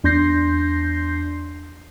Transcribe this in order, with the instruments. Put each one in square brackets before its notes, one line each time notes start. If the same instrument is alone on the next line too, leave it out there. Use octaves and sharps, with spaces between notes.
[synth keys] E2 D4 C6 G6 A#6 C7